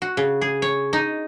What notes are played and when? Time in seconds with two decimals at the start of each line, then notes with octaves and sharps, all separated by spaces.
0.02 F#4
0.17 C#3
0.41 G#4
0.62 C#5
0.93 D#4